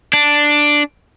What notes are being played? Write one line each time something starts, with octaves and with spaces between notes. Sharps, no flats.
D4